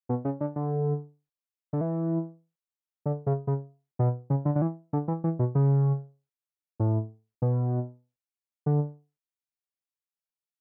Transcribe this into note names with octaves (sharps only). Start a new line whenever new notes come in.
B2
C#3
D3
D3
D3
E3
D3
C#3
C#3
B2
C#3
D3
D3
E3
D3
E3
E3
B2
C#3
A2
B2
D3